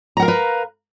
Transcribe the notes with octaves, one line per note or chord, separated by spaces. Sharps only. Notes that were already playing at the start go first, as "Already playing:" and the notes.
A#4 B4 F5 F#5 A#5